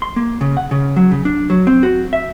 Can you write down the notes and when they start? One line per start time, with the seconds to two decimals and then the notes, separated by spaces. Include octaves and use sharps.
0.02 C6
0.16 A#3
0.41 C#3
0.57 F#5
0.71 C#3
0.96 F#3
1.11 C#3
1.25 D4
1.50 F#3
1.67 C4
1.83 F#4
2.13 E5